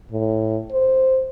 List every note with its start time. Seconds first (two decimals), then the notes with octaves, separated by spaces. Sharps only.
0.11 A2
0.72 C5